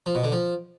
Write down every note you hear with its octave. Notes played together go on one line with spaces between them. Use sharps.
F3
B2
D3
F3